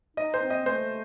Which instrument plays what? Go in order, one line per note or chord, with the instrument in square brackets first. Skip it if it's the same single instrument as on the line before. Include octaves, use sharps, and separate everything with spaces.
[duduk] D#4 [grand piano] D#5
[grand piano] C5
[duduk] C4
[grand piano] D#5
[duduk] A3 [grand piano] C5